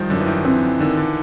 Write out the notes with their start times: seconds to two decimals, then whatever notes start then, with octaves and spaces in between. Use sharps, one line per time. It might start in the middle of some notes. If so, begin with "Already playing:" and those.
Already playing: D#3 F3 G3
0.10 F#2 D3
0.20 E3
0.26 D#3
0.45 E3 C4
0.62 D#3
0.79 D3 D#3
0.97 D3